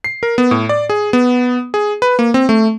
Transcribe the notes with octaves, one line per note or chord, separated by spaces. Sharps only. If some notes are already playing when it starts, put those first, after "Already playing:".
C7
A#4
B3
A2
D5
G#4
B3
G#4
B4
A#3
C4
A3